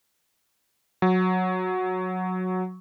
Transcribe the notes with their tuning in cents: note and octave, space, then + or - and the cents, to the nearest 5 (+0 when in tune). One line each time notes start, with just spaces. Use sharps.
F#3 -10